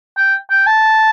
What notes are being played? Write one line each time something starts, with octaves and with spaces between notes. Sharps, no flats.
G5
G5
A5